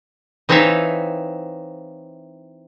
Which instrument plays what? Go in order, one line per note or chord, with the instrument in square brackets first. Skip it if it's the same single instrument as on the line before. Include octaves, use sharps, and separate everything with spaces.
[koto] E3 C4 D#4 C#5 E5 F5